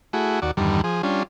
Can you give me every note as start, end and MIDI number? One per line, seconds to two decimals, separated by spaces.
0.13 0.40 57
0.13 0.40 64
0.13 0.40 66
0.13 0.40 68
0.42 0.51 39
0.42 0.51 66
0.42 0.51 74
0.57 0.81 40
0.57 0.81 43
0.57 0.81 50
0.57 0.81 51
0.57 0.81 55
0.84 1.02 53
0.84 1.02 68
1.03 1.23 55
1.03 1.23 61
1.03 1.23 62
1.03 1.23 65